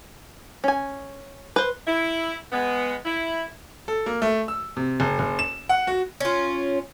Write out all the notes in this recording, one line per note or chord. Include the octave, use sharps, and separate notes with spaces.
C#4 G#5
B4 C5
E4
G#3 B3
E4
A4
A#3
A3
E6
C3
F#1
F#1
E7
F#5
F#4
C#4 F4